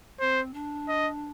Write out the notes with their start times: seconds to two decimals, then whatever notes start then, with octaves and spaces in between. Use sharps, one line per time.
0.20 C4 C5
0.54 D4
0.88 D#5